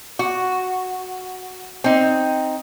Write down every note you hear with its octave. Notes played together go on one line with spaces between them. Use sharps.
F#4
C4 D#4